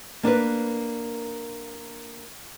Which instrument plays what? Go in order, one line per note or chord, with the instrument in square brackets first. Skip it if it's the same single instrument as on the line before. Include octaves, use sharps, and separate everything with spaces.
[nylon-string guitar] A#3 D4 A#4 B4